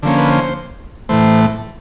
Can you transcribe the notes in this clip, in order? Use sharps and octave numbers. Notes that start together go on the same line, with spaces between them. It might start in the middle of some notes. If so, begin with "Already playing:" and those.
D3 F3 A#3 C#4
B4
C5
A2 E3 A3 C5